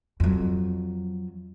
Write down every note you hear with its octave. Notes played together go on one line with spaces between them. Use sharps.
F2 F#3